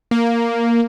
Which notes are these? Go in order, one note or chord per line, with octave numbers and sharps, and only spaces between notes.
A#3